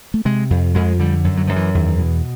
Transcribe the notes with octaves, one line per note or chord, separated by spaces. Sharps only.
A3
C3 G#3
F2
F2 G#3
D3 G3
F#2
F#3
F#2 F3
E3
E2 D#3
B2 E3